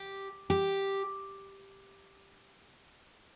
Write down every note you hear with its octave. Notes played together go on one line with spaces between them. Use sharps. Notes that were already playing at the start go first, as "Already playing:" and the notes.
Already playing: G4
G4